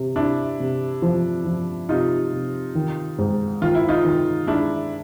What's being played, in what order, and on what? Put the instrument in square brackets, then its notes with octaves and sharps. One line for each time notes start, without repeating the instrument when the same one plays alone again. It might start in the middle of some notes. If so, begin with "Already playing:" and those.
Already playing: [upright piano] C3
[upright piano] C3 [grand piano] D4 E4
[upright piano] C3
F3
F3
[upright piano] C3 [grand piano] D#4 F4
[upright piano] C3
D#3
G#2
[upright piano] D#3 [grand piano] F4
[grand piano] E4
D#4 F4
[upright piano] D#3
[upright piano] G#3 [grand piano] D4 E4